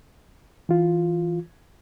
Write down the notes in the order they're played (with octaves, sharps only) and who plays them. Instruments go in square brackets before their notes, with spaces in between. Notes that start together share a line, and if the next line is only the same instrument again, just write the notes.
[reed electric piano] E3 F4